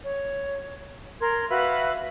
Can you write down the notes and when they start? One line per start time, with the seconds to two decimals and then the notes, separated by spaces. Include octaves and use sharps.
0.04 C#5
1.20 A#4 C6 G#6
1.50 F#4 B4 E5 F5